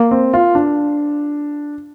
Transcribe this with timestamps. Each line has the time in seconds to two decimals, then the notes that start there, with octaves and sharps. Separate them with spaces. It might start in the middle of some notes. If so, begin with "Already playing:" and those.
Already playing: A#3
0.11 C4
0.33 F4
0.55 D4